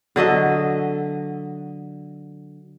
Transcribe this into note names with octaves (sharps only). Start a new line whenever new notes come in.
D3 F#3 D#5 E5